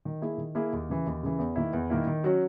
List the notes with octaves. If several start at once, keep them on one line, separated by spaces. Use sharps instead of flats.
D#3
A#3 E4 G#4
D#3
A#3 E4 G#4
D#2
C#3 E3
D#2
C#3 E3
E2
D#3 A#3 E4
E2
D#3 A#3 E4
D#3
F#3 C#4 F#4